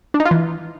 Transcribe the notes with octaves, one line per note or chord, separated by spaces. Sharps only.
D4
D#4
F4
E3